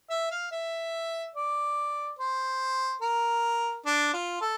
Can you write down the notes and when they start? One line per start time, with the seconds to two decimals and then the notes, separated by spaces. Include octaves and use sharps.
0.10 E5
0.31 F5
0.52 E5
1.35 D5
2.19 C5
3.02 A#4
3.86 D4
4.14 F4
4.41 A4